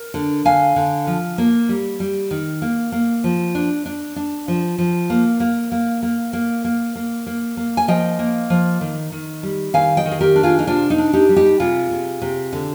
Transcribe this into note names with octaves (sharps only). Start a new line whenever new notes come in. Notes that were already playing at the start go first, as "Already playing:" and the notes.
Already playing: A#4
D3
D3 F5 G#5
D3
F3
A#3
G3
G3
D#3
A#3
A#3
F3
D4
D4
D4
F3
F3
A#3
A#3
A#3
A#3
A#3
A#3
A#3
A#3
A#3
G#5
F3 D#5 G5
A#3
F3
D#3
D#3
G3
D#3 F5 G#5
D#5 G5
D#3
G#4
G4 A#4
D4
F4 G#4
D#4
C3 D4 F4
D#4
D4
D#4 G4
G3
D#4 G4
C3 F4 G#4
C3
C3
D3